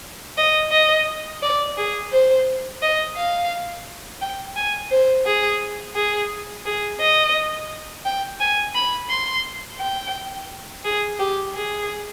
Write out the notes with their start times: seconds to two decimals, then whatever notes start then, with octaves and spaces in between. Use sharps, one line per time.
0.37 D#5
0.71 D#5
1.42 D5
1.77 G#4
2.12 C5
2.82 D#5
3.16 F5
4.22 G5
4.56 G#5
4.91 C5
5.26 G#4
5.95 G#4
6.66 G#4
7.00 D#5
8.05 G5
8.40 G#5
8.75 B5
9.10 C6
9.80 G5
10.85 G#4
11.19 G4
11.54 G#4